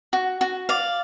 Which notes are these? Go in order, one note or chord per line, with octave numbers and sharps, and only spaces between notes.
F#4
F#4
D5 F5